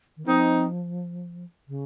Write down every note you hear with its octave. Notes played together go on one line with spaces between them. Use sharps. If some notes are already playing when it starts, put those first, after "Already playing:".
D#3
F3 C4 D#4
C#3